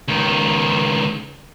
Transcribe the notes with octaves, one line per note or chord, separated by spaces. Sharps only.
C#2 D#3